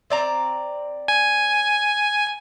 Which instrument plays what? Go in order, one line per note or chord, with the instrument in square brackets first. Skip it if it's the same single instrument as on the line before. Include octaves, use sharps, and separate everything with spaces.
[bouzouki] C4 D5 A#5
[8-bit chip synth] G#5